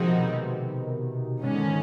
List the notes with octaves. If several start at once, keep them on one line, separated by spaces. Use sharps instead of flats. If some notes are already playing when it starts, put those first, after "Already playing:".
Already playing: C3 D#3 F3 G#3 C4 D#4 F#4
B2
C3
G#2 D3 D#3 G#3 C#4